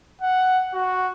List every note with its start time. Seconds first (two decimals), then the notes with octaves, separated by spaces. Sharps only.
0.21 F#5
0.74 F#4